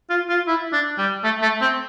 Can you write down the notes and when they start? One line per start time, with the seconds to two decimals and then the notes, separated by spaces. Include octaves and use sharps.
0.10 F4
0.29 F4
0.47 E4
0.72 D4
0.98 G3
1.24 A3
1.42 A3
1.61 C4